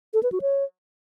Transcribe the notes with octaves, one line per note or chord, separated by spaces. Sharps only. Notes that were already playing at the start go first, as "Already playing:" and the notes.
A4
B4
F#4
C#5